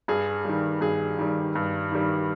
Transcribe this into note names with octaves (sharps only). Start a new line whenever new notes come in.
G2 G#4
D#3 G3
G2 G#4
D#3 G3
G2
D#3 G3